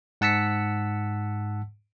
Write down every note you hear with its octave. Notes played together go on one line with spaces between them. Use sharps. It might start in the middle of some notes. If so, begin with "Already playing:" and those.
G#2 F#5 A5 E6 B6 C#7